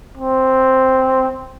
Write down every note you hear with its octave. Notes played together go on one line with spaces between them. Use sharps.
C4